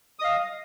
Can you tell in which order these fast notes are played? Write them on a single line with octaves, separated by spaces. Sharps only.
D#6 D#5 F5